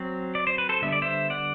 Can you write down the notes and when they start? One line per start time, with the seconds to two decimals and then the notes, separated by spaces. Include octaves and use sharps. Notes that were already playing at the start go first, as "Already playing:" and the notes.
Already playing: F#3 C4
0.35 D5
0.47 C5
0.58 B4
0.69 A4 C5
0.82 D3 G3 B3 E5
0.92 D5
1.02 C5 E5
1.30 D5 F#5